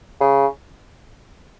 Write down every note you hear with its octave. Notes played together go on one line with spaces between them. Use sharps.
C#3